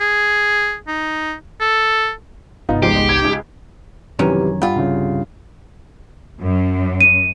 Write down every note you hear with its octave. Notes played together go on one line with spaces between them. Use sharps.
G#4
D#4
A4
G1 C2 B3 D#4 F4
F3 G#3 G4 C7
G#3
G#6
C#2 D#4
F#2 C3 D#3 E3 G3 C#4
G2 F4 F#5 B5
C2 C#3
F#2
D#7